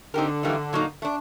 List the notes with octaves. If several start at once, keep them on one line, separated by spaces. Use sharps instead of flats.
D3 C4 D#4 G4 A#4
E3 G3 A#3 D#4
A#2 F#3 A#3 D#4
A3
D4